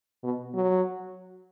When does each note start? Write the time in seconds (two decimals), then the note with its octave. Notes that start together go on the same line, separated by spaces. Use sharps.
0.24 B2
0.54 F#3